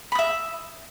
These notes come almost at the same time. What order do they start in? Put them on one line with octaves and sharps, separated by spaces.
B5 D#6 E5